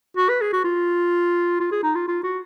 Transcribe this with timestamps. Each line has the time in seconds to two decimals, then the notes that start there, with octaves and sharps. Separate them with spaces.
0.17 F#4
0.29 B4
0.41 G#4
0.53 F#4
0.64 F4
1.60 F4
1.72 G#4
1.83 D#4
1.95 F4
2.08 F4
2.23 F#4